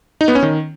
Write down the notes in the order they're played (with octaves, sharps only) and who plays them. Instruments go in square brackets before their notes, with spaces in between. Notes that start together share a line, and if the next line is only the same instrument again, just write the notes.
[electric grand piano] D#4
B3
C#4
D#3